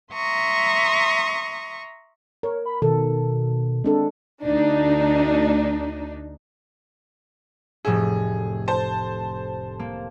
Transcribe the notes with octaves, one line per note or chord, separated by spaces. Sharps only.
E5 A#5 C6 C#6 D#6
A#4 C#5
B5
B2 D#3 A4
G#3 C4 D4 A4
D2 D4 D#4
F1 A2 G#4 E5
C5 A5
A#3